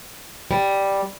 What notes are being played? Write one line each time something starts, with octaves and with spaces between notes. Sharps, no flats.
G3